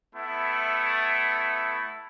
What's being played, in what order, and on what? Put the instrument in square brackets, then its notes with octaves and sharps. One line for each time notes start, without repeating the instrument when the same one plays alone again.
[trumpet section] A3 B3 E4